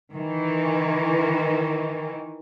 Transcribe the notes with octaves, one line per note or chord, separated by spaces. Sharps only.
D#3 E3